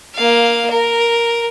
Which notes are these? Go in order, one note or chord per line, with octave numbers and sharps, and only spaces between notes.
A#3 F5
A#4